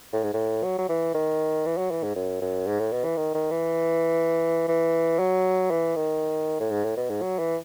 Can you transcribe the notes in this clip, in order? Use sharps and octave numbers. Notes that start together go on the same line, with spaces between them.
A2
G#2
A2
F#3
F#3
E3
D#3
E3
F#3
E3
G#2
F#2
F#2
G#2
A2
B2
E3
D#3
D#3
E3
E3
F#3
E3
D#3
A2
G#2
A2
B2
G#2
F#3
E3